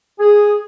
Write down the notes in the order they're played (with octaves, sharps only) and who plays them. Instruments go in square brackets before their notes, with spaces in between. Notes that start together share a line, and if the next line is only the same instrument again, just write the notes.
[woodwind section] G#4